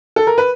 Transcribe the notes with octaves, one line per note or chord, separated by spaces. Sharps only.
A4
A#4
B4